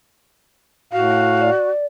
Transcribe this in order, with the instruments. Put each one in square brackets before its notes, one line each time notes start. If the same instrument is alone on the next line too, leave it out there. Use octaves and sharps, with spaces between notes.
[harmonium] A2 F5 [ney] F#4
[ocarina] D5